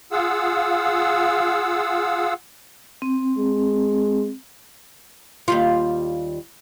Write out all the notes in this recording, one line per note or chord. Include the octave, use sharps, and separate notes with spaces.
F4 G#4 F5 F#5 E6
C4
G#3
D#2 G3 F4